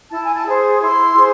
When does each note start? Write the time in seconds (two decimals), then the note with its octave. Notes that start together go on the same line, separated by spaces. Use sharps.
0.11 E4 A5
0.23 G#5
0.34 A5
0.46 G#4 C5
0.81 E4 C6
1.16 G#4 C5